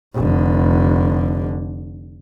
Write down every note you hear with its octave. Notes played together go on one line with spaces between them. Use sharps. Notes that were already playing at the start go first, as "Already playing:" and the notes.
F1 D3